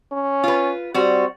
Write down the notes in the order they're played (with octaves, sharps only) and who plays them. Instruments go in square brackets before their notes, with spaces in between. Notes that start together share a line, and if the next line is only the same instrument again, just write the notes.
[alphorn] C#4
[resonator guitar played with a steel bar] F4 B4
[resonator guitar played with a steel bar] G3 F#4 [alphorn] C4